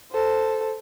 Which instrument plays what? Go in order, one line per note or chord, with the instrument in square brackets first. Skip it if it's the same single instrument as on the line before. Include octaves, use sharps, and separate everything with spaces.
[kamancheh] A4 C5